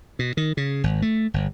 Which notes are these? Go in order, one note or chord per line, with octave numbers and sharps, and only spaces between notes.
B2
D#3
C#3
G#1
A3
G1